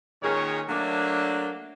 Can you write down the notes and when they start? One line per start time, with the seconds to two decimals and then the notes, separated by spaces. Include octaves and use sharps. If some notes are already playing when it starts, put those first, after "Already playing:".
0.22 A#2 D#3 C#4 G#4 A#4 C#5
0.69 F#3 A3 A#3 D4